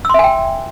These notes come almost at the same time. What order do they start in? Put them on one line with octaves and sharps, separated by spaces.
E6 C6 E5 G#5 G5